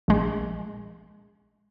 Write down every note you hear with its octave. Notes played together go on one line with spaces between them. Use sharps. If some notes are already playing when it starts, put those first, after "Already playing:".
A#1 G#3